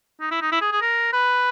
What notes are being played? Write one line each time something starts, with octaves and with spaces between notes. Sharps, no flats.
D#4
E4
D#4
E4
G#4
G#4
A#4
B4